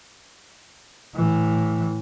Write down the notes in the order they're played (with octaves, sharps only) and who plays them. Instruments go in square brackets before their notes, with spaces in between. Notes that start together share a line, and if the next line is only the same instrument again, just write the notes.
[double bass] A2 E3